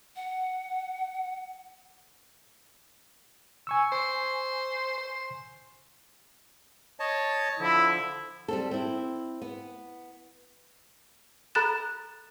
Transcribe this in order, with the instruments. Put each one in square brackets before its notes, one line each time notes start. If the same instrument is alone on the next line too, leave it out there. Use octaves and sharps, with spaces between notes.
[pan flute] F#5
[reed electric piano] G#5 C#6 E6
[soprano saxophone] C5
C5
[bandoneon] C#5 D#5 A5
[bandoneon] D3 F3 [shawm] E4
[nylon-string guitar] G3 C4 A4
C4 E4
B3
[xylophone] A4 A#5 B5 F#6 A6 E7